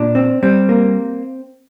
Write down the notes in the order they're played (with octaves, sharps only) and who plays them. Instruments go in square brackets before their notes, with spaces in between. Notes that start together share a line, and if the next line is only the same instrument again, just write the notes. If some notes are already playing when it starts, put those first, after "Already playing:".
Already playing: [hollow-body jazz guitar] A#2 D4
C4
G3 C4
A#3